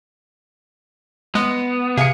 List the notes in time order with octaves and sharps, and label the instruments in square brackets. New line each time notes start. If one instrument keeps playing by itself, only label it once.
[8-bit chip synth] G#3 [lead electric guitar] B3
[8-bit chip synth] C3 [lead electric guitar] G#4 [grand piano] F5 C#7